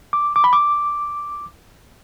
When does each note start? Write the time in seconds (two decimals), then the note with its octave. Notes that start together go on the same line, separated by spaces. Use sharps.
0.13 D6
0.36 D6
0.44 B5
0.53 D6